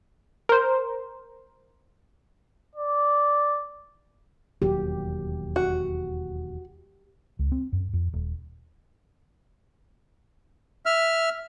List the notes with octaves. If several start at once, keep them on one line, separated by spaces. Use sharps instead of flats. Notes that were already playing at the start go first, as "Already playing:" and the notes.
A#4 C5
D5
E1 D#2 F#3 G4
F#4
C#2
C4
F#2
F2
D#1
E5 F6